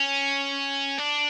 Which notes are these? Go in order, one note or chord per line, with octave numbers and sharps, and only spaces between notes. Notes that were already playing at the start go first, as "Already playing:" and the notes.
Already playing: C#4
D4